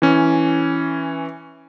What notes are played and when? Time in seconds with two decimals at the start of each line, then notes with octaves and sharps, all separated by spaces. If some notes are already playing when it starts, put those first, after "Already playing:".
0.02 E3 C#4